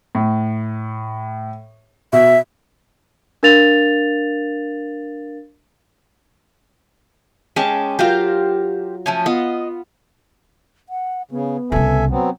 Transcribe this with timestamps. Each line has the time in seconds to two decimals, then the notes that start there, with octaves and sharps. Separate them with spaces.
0.15 A2
2.13 B2 E5
3.43 D4 A#4 F5 A6 F7
7.56 G#3 C#4 G4 A5 C#6
7.99 F#3 F4 G4 A#4 C5 F5
9.06 F3 A3 C#4
9.26 B3 F4 D#5
10.89 F#5
11.31 C#3 B3
11.72 C2 C#3 A4 E5 G#5
12.10 F#3 B3 C4